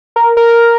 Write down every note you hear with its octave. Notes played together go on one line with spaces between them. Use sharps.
A#4
A#4